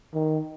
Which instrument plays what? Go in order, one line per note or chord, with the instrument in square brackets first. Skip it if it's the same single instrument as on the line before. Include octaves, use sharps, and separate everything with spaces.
[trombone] D#3